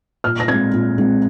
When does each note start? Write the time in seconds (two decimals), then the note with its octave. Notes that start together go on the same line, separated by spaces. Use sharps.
0.24 A#2 F6
0.40 A#6
0.48 G#3 C4 G#6
0.73 A#2
0.98 G#3 C4